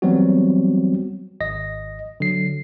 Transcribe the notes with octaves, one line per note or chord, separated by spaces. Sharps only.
E3 F#3 G3 B3 C4 F#4
G#1 D#5 A#6
D3 F#3 C7